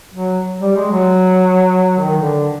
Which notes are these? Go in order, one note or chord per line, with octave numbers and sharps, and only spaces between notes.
F#3
G3
G#3
F#3
D#3
D3